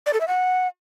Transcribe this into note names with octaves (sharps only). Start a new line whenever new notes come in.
D5
A4
E5
F#5